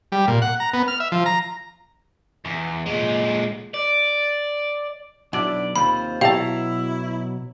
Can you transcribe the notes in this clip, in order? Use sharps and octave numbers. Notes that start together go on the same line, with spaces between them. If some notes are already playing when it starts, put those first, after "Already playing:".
G3
A#2
F#5
A#5
B3
F6
E5
F3
A#5
E2
A#2 G#3
D5
B1 F#3 D4 E4 D5
D#2 C3 F4 C5 B5
B2 F#3 E4 G4 F5 A5 A#5